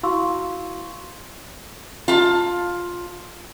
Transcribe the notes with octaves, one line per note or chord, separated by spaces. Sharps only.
E4 F#4 F5 C6 C#6 E6
F4 A5